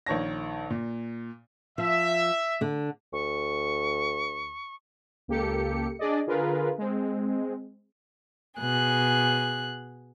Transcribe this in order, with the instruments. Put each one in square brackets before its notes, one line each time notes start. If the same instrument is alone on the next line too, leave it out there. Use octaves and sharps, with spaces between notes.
[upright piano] A#1 D#3 C#5 A5 A#6
A#2
[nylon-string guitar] F3 [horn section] E5
[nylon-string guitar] D3 D4
[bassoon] D2 [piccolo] C#6
[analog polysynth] C#2 A#3 G4 A4 C#7
D4 G#4 D5 D#5
D3 F4 G#4 A#4 B4
G#3 C4
[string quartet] B2 G#4 F#6